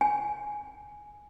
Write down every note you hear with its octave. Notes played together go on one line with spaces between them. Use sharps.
G#5